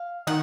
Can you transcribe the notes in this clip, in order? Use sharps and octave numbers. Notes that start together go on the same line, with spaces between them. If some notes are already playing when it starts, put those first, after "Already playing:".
Already playing: F5
D#3 F#5